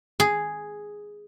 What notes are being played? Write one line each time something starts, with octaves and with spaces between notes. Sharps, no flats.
G#4